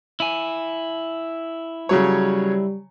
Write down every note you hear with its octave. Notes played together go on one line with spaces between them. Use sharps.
E4 G#5
C#3 F#3 G3 C#5